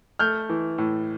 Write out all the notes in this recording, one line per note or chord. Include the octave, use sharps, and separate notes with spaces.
A3 F6 G6
E3
A2